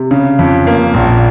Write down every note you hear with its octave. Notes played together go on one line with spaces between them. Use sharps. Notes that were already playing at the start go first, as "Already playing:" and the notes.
Already playing: C3
C#3
F2
A#3
A#1